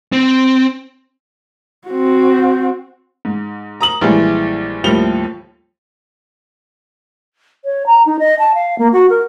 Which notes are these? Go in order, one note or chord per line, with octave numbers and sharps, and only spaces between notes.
C4
C4 F#4
G#2
A#5 D#6 F#7
A#1 E3 G3 G#3
D#2 A2 F3 G3 F7 G7
C#5
A#5
D#4
D#5
A5
F5
A#3
F#4
A#4